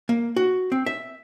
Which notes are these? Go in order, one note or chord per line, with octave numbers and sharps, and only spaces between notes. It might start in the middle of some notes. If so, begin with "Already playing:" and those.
A#3
F#4
C4
E5